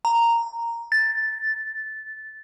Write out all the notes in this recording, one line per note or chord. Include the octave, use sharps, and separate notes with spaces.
A#5
A6